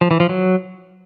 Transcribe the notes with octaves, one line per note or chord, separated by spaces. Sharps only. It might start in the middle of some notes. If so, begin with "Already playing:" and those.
F3
E3
F3
F#3